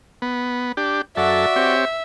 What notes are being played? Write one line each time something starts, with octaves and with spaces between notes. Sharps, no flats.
B3
D4 G4
F#2 F#4 A4 D5 E5
C4 G4 C#5